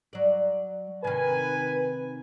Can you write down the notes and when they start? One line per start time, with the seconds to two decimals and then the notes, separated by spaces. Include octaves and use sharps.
0.13 F#3 D5
1.04 C3 D#3 B4 G#5